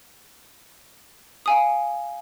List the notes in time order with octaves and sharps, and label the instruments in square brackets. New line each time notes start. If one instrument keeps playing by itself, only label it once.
[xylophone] F5 G#5 D#6